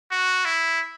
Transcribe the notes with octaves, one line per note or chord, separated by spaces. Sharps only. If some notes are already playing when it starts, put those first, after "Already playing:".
F#4
E4